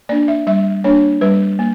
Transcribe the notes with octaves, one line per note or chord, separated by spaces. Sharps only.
A#3 D4 D5
E5
G3 E5
A#3 D4 C#5
G3 B4
A#3